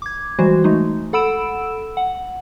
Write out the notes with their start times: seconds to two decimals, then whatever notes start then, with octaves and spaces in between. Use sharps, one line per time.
0.02 D6 G#6
0.39 E3 G3 G#3 F#4 C5
0.64 G#3 A3 D#4
1.13 A4 F#5 B5 E6 D7 E7
1.97 F#5